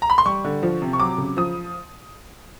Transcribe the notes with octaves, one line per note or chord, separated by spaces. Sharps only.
A#5
B5
C6
G3 C#6
D3
F3
C3
C#6
F#3 D6
C#3
F3 D#6